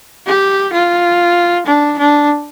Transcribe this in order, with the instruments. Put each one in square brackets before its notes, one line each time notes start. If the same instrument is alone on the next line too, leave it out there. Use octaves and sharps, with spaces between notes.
[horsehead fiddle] G4
F4
D4
D4